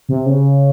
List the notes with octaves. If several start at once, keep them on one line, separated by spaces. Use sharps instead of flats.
C3
C#3